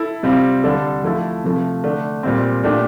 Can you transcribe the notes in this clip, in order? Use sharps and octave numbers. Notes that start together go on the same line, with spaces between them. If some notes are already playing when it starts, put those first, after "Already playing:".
Already playing: E4 A4
C3 G3 C4 F4
D3 G3 D4 A4
F3 A3 E4 A4
C3 F3 A3
D3 A3 D4
A#2 G3 C4
A#2 A3 D4 G4